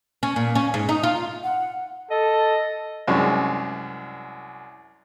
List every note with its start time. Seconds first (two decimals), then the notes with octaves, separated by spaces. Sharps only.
0.23 C#4
0.36 A#2
0.55 C#4
0.74 G#2
0.89 D#4
1.03 F4
1.43 F#5
2.11 A4 D#5
3.07 C2 F#2 G#3 D4 C#5